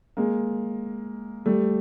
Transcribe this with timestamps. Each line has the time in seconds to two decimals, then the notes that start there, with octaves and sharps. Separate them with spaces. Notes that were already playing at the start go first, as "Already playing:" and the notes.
0.17 G#3 A#3
1.46 G3 A3